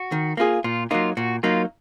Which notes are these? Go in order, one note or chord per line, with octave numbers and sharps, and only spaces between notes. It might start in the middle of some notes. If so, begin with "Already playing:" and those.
Already playing: F#4
D#3
A#3 F4 G#4
A#2 F4
F#3 A#3 D#4 F4
A#2 F#4
F#3 A#3 D#4 F4